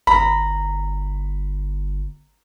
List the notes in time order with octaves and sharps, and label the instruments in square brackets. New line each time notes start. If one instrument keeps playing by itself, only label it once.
[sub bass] G1 [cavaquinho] A#5 [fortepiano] B5